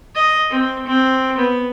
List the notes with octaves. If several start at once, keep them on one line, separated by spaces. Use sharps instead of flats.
D#5
C4
C4
B3